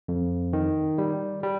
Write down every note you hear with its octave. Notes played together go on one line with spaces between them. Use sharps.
F2
D#3
G3
G3